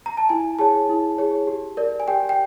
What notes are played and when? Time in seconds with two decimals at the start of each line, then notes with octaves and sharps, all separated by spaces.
0.06 A#5
0.17 A5
0.29 E4 G#5
0.59 G#4 C#5 A5
0.89 E4
1.18 G#4 C#5
1.47 G4
1.77 A#4 D5
2.00 G#5
2.08 G4 G5
2.29 G5